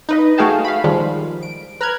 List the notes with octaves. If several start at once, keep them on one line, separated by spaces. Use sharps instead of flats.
D#4 B4 D#5
A3 F#4 G#4 F5 G5 A5
F5 B5
D#3 F3 G3 G#3
D7
B4 A#5 F6 F#6 G#6